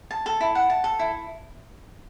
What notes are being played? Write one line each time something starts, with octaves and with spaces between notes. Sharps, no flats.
A5
A4
E4
F#5
A5
A4
E4